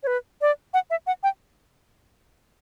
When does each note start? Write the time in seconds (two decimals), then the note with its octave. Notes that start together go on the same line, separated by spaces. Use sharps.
0.03 C#5
0.07 B4
0.41 D5
0.74 F#5
0.90 E5
1.07 F#5
1.23 G5